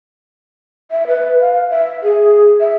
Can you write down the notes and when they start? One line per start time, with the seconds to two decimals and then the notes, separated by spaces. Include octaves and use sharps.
0.91 E5
1.08 B4
1.40 F5
1.70 E5
2.03 G#4
2.60 E5